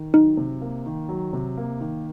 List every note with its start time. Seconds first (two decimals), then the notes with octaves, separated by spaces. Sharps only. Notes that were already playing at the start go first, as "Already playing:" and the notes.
Already playing: D#3
0.13 F#3 D#4
0.37 C3
0.61 A#3
0.86 D#3
1.09 F#3
1.33 C3
1.57 A#3
1.81 D#3